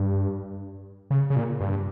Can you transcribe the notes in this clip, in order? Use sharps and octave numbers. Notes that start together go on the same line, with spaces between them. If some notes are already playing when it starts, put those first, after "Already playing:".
Already playing: G2
C#3
C#3
A#2
G2